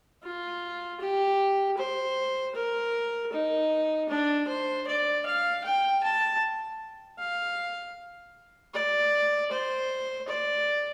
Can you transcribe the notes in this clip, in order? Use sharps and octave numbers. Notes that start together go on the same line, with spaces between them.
F4
G4
C5
A#4
D#4
D4
C5
D5
F5
G5
A5
F5
D5
C5
D5